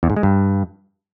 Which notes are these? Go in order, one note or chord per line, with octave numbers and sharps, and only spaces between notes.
E2
G#2
G#3
G2